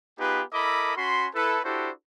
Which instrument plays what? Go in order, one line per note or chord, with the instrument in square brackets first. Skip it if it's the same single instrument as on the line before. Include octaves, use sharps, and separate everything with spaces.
[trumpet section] B3 D#4 F4 G4 G#4 B4
E4 A4 A#4 D#5 B5 D6
C#4 F#4 B5 C6
E4 A4 B4
D4 E4 F#4 G4 A4 C5